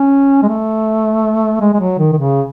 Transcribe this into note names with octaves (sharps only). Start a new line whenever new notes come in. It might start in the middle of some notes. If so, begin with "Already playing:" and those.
Already playing: C#4
G#3
A3
G#3
G#3
F#3
D#3
D#3
C#3